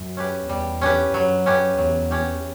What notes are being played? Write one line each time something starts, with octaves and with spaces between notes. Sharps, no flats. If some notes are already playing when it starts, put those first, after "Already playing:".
Already playing: F#2
C#4 G4 B4
E2 G3
C#4 G4 B4
F#2 F#3
C#4 G4 B4
E2 F#3
C#4 G4 B4